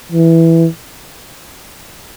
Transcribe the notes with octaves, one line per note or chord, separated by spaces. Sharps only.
E3